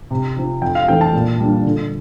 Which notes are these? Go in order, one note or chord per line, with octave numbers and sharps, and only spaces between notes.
C3
F3 C4
F2 G5
F5
E3 A3 C4 G5
A5
A#2
G3 A#3 D4
D3